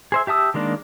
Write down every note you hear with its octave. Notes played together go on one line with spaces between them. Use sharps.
G#4 C5 E5
G4 E5 A5 D#6 E6
D#3 G#3 A#3 D4